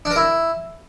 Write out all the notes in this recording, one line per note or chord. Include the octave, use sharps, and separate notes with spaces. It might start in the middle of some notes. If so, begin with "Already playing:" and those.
D4
A#4
E4